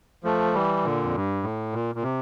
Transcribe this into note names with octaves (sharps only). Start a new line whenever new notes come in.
F3 A3
E3 G3
A#2 D3
F2
G2
A2
A#2
A#2
C3